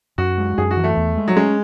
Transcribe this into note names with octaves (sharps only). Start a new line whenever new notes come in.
F#2 F#4
G#3
F#2 G#4
F#4
E3
A3
E2
G#3
F#3
G#3 C#4